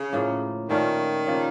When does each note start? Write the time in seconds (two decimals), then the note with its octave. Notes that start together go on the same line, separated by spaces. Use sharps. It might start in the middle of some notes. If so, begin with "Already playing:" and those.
Already playing: C#3 C#4
0.13 A2 F3 A#3
0.69 A#2 D#3 A3 C#4 F4
1.27 C#3 F3 A#3